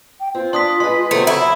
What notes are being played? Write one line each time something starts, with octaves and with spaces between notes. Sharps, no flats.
G5
C4 F4
D4 C6 D#6 B6
G#3 B4 C6
C3 F#3 A3
E4 B5